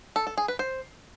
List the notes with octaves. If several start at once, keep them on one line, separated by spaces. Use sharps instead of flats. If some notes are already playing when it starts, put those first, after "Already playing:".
A4
A4
G#4
B4
C5